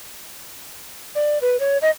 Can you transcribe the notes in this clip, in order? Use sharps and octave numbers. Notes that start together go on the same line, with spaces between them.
D5
B4
C#5
D#5